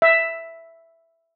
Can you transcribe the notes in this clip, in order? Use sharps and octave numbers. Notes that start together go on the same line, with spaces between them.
E5